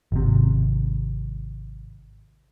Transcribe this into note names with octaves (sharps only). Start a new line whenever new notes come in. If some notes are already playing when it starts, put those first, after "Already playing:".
G#1 C3